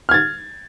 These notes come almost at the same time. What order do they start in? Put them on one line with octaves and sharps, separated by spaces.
F6 G#6 A6